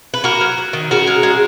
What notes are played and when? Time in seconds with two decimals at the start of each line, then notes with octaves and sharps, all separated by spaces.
0.14 B4
0.24 A#3 F#4 A#4
0.41 F#3
0.58 F#3
0.73 D#3
0.91 C#3 F#4 A#4
1.07 G#3
1.23 G#3